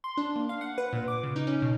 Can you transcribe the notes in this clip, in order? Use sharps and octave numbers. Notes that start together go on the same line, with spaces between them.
C6
D4
A#3
F5
F#5
B4
A#2
D6
C#3
D#4
C#4
B2